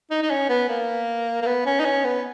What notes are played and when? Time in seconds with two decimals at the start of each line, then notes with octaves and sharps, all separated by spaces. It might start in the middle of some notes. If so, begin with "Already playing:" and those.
0.11 D#4
0.22 D#4
0.30 C#4
0.49 B3
0.69 A#3
1.42 A#3
1.46 B3
1.66 C#4
1.80 D#4
1.85 C#4
2.05 B3